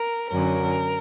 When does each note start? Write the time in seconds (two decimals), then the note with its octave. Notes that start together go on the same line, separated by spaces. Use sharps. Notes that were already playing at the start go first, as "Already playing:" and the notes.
Already playing: A#4
0.30 F#2 D3 F#3 C#4 A#4